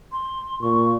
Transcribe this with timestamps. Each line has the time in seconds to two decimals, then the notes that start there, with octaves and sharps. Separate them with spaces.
0.12 C6
0.62 A#2 C#6